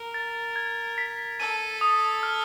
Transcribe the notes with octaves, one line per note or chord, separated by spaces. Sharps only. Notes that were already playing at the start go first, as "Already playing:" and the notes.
Already playing: A#4
A6
G#6
B6
A4 D#7
D#6
F6